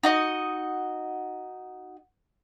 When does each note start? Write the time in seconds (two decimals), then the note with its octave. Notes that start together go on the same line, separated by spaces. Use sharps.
0.03 D#4 F#4 D#5